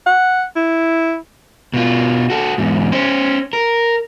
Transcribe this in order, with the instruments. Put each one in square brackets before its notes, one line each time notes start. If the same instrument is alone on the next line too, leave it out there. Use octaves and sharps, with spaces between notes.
[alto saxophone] F#5
E4
[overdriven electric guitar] B2 F4
F#4 A4
E2 G#2
C#4 C5
A#4